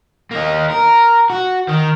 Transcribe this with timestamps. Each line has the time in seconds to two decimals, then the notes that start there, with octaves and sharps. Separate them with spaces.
0.31 A#3 D#4
0.69 A#4
1.30 F#4
1.68 D#3